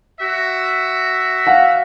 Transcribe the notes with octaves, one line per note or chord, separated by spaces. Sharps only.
F#4 E5
F5 F#5